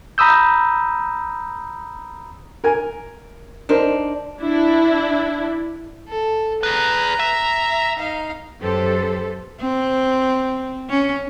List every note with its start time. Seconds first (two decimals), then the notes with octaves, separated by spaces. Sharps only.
0.18 A#5 B5 D#6 E6 G6
2.64 A#4 G#5
3.69 D4 D#4 A#4 C5
4.41 D4 E4
6.09 A4
6.63 G#4 B4 A#5
7.20 E5
7.97 D#4 F5
8.62 F#2 G4 A4 B4 C5
9.61 C4
10.90 C#4